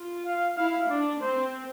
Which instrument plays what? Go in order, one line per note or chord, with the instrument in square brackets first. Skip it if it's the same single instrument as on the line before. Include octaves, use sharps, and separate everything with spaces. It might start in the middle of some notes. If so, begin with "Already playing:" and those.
Already playing: [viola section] F4
[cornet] F5
[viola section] E4 [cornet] F5
[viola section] D4 [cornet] D5
[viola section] C4 [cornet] C5